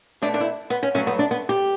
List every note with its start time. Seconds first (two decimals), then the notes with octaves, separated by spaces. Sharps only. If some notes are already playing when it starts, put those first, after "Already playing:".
0.22 B2 A3 D4
0.34 D4
0.40 E4
0.70 B3
0.83 C#4
0.95 G2 F#3 A3 C#4
1.07 B3
1.19 D4
1.31 B3
1.49 G4